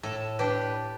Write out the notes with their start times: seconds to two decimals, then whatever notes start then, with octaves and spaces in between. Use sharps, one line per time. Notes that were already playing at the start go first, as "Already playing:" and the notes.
0.03 A2 A4
0.39 D4 G4 B4